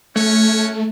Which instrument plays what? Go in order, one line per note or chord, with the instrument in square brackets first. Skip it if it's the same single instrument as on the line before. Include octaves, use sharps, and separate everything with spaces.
[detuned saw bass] A3 [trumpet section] C#4 F#4 C#5